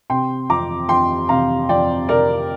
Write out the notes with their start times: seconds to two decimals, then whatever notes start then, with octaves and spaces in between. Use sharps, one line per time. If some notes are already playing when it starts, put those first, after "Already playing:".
0.10 C3 G5 C6
0.49 F2 A#5 D6
0.89 F2 G5 C6
1.29 C3 F5 A#5
1.69 F2 D5 G5
2.09 C3 A#4 D5